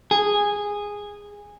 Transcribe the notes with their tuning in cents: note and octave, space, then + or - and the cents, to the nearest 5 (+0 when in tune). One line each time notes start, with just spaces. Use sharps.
G#4 -10